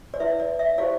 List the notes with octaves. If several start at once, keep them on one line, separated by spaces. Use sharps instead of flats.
D5
E4 B4 E5
D5
E5
E4 G4 C5 D5 F5